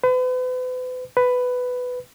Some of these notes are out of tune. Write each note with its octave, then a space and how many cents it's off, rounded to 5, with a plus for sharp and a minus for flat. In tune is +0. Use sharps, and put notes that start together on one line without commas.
B4 +40
B4 +10